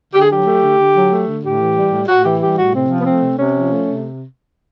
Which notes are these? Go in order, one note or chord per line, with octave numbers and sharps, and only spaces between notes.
D3 G4
G#4
F#3 G4
A3
D3
D3
F#3
A3
D3
A2 G4
E3
G3
A2
A2 F#4
E3 G4
G3 G4
A2 F#4
C3 C4
F3
B3
A3 C4
C3
C3 C#4
F3
A3
C3